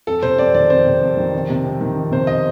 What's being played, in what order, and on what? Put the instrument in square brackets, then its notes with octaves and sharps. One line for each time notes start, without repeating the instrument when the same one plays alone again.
[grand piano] F2 [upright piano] A4
[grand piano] C3 [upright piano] C5
[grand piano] F2 [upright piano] D5
[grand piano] D#3 [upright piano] D5
[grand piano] F2 [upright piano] C5
[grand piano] C3
F2
D#3
F2
C3
F2
D#3
F2
[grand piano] C3 [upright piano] C5
[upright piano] D#5